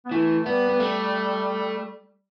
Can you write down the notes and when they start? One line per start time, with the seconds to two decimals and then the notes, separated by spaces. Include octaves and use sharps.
0.05 B3
0.11 E3 A3
0.46 G3 B3
0.69 B3
0.80 A3